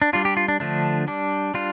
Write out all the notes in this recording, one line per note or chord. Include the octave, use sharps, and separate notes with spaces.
D4
G3 D4 F4
G4
F4
D4
D3 F3 A3 D4
G3 D4
G3 D4 F4